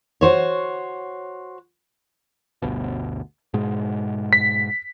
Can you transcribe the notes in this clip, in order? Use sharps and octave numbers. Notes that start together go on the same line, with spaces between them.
F#4 C5 C#5
G1 D2 B2
G#2 B2 G#3
B6